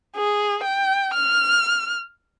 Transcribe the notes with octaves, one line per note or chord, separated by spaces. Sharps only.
G#4
G5
F6